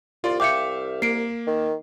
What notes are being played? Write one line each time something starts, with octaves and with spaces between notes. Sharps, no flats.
C2 F4 D5 C6
E5 F5 G5 D6 G6 C#7
A#3 C7 D7
D#3